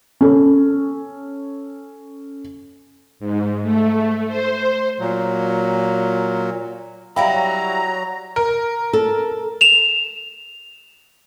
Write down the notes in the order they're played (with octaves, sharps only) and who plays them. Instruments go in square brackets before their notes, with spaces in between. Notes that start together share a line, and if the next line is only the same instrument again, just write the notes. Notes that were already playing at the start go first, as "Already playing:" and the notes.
[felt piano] C#4 A4
[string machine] G#2
A3
C5
[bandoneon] A#2 F#3
[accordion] F#3 A#5 [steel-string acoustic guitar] G3 E4 E5 [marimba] F5 G5 B5
[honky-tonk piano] A#4
[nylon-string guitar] A4
[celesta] E7 F7